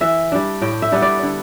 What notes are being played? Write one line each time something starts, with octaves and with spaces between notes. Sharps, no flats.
E3 E5
G3 D4
A2 G5
E5
G3 B3 D4
D5
D3